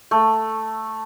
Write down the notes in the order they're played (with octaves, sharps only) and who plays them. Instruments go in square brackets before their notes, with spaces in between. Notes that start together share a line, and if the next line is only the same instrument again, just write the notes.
[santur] A3